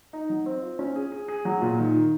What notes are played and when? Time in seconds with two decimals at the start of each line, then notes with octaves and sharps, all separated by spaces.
0.13 D#4
0.29 F#3
0.46 C4
0.62 F4
0.79 C#4
0.96 G#4
1.12 G#4
1.28 G#4
1.45 F#3
1.62 A#2
1.78 D#3